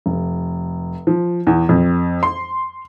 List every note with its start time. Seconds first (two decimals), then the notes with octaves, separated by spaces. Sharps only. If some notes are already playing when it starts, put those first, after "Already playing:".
0.06 F1
1.07 F3
1.47 E2
1.69 F2
2.23 C6